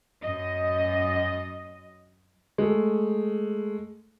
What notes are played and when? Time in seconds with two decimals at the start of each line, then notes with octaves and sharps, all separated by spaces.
0.24 F#2 D#5
2.58 G#3 A3